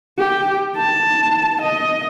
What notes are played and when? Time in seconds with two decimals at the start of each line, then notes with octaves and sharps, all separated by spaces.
0.18 G4
0.77 A5
1.61 D#5